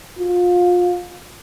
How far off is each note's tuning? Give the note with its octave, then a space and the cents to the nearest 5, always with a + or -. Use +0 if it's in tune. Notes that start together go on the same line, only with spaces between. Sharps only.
F4 +30